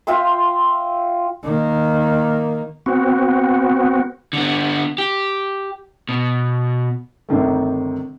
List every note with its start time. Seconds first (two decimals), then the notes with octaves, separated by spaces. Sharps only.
0.07 F4 E5 G5 C6
1.43 D#3 A#3
2.86 B3 C4 F#4
4.33 D3 B3
4.98 G4
6.09 B2
7.29 G1 C3 D#3 A3